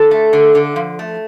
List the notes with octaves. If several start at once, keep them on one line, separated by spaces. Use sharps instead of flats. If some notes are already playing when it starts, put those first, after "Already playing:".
Already playing: D3 A4
A3
D3
D3
F3
A3